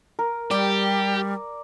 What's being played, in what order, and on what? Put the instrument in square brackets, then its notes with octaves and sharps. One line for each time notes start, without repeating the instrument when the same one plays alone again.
[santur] A#4
[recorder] G3 [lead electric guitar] G4 [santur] D5